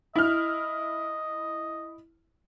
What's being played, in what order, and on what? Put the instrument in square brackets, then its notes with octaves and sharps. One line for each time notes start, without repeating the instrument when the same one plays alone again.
[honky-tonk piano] E4 F6 [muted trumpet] D#5